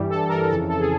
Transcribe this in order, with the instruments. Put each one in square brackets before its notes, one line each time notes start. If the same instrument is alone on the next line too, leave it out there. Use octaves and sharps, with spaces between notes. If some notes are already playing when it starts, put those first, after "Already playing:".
Already playing: [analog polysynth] G2 E3 G3
A4
A#4
F2 C#3 E3 A4
A4
G#4